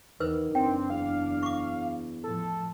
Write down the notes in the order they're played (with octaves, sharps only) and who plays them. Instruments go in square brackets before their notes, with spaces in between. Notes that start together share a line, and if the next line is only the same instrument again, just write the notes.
[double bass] E2 E3 [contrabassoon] D#3 [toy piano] B4 C5 E6
[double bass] F#1 D4 [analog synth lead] C4 [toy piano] G5
[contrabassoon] E2 [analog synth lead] F5
[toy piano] C#6 D6
[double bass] A2 F3 [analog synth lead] A4